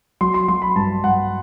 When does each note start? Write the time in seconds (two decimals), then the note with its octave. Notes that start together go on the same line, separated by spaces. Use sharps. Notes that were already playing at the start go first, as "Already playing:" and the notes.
0.21 F#3 C6
0.34 C6
0.48 F#3 C6
0.62 B5
0.76 G2 A5
1.04 G2 F#5